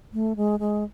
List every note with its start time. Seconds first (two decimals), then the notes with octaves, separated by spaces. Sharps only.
0.13 A3
0.37 G#3
0.60 G#3